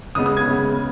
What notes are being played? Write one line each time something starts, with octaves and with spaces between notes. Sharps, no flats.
C#3 G#3 B3 D#6
D#6
G#6
C#3 G#3 B3